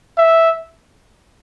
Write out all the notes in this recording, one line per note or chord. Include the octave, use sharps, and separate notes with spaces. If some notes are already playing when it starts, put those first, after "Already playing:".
E5